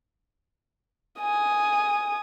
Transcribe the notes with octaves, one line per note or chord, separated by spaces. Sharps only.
G#5 D#6